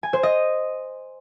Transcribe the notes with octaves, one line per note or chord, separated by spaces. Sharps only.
G#5
C5
D#5